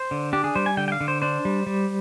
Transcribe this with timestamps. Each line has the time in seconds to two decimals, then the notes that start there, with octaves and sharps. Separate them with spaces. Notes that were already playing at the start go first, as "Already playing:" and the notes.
Already playing: C5
0.11 D3
0.33 D4 G4
0.44 G#4
0.55 G3 C5
0.66 G#5
0.77 D3 G5
0.88 G5
0.92 F5
1.01 D3
1.08 C5
1.22 D4 C5
1.45 G3
1.67 G3